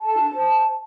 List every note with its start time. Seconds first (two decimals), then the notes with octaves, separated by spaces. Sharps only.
0.01 A4 A5
0.17 D4
0.33 C5